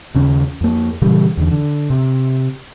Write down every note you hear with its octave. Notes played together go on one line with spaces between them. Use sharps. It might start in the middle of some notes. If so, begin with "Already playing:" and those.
D#2 C#3 C#4
F2 A#3
A#2 C#3 E3 G3
E2 D3
D3
C3